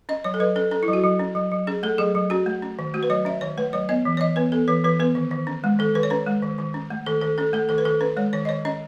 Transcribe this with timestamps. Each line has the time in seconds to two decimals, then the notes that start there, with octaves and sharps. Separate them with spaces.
0.09 C#4 D#5
0.24 F#3 C#5
0.34 A4
0.40 F#3 B4
0.56 C#4 A4
0.71 C#4 A4
0.83 E4
0.88 F#3
0.93 F#4
1.04 F#3
1.19 C#4
1.35 F#3
1.51 F#3
1.67 C#4 G#4
1.83 A3 A4
1.98 F#3 G#4
2.15 F#3
2.30 C#4 F#4
2.46 A3
2.62 C#4
2.79 D#3
2.94 A3 F#4
3.03 B4
3.10 F#3 C#5
3.25 C#4 E5
3.41 D#3 C#5
3.57 A3 B4
3.73 F#3 C#5
3.89 B3 D#5
4.05 E3
4.17 C#5
4.20 E3 D#5
4.36 B3 B4
4.52 B3 A4
4.68 E3 B4
4.84 E3 B4
4.99 B3 B4
5.15 D#3
5.31 D#3
5.47 C#4
5.64 G#3
5.79 D#3 A4
5.95 D#3 B4
6.03 C#5
6.10 C#4 B4
6.26 G#3
6.42 D#3
6.58 D#3
6.74 C#4
6.90 A3
7.06 D#3 A4
7.21 D#3 A4
7.38 C#4 A4
7.53 A3 A4
7.69 D#3 A4
7.78 B4
7.85 D#3 A4
8.01 C#4 B4
8.17 G#3 C#5
8.33 D#3 C#5
8.45 D#5
8.48 D#3 C#5
8.65 C#4 D#5